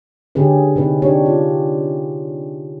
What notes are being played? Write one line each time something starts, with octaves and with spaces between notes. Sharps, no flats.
D3 C#4 G4 G#4 B4
C3 D#4 B4
D4 D#4 G4 C#5
F4